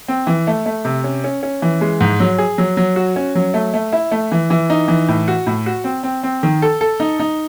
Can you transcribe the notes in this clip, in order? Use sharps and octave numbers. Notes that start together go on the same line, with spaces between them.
C4
E3
A3
A3
C3
C#4
C#4
C#4
E3
G#3
G#2
F#3
G#4
F#3
F#3
F#4
C#4
F#3
A3
A3
E4
A3
E3
E3
D#4
E3
A2
F#4
A2
F#4
C4
C4
C4
D#3
A4
A4
D#4
D#4